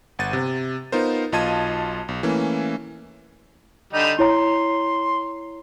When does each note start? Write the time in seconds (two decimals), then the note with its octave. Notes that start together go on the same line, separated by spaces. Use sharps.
0.19 G1 F#5 A6 D#7
0.33 C3
0.92 B3 D#4 F4 A#4 C5
1.32 B1 F4 D#5 A5 G#6 D#7
2.09 B1
2.23 E3 A3 A#3 C#4
3.93 D3 G3 D#4
4.19 E4 C#5 A#5 C6